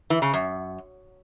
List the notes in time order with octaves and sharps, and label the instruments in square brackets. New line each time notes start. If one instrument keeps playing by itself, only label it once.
[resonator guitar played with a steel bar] E3
C#3
F#2